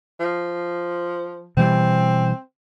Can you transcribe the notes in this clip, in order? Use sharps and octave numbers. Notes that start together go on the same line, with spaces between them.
F3
B2 E3 G3 C4